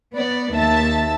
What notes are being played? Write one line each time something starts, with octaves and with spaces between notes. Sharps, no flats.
B3 D5
D#2 E5 A5 A6